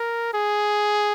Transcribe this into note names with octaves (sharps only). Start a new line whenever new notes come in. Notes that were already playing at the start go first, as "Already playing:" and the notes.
Already playing: A#4
G#4